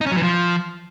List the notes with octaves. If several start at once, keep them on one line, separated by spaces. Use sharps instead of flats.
D#4
C#4
F#3
E3
F3